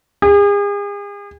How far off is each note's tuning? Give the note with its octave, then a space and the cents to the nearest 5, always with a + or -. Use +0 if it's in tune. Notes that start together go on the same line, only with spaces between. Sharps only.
G#4 -40